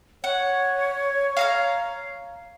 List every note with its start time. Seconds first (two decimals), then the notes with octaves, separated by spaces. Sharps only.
0.24 C#5 F#5
1.37 F5 A#5 F6